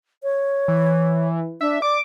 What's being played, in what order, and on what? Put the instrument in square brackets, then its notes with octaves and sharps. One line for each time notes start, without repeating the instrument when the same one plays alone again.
[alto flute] C#5
[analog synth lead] E3
[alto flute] D4 [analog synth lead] E5
[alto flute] D5 [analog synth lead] D6